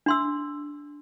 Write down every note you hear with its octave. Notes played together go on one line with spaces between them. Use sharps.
D4 C6 E6